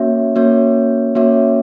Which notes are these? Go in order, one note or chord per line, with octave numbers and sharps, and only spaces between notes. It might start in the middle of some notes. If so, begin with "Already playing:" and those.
Already playing: A#3 C#4 F#4 C#5 E5
A#3 C#4 F#4 C#5 E5
A#3 C#4 F#4 C#5 E5